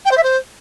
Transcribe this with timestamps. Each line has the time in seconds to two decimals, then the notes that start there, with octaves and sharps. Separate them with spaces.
0.05 G5
0.11 C5
0.17 E5
0.23 C5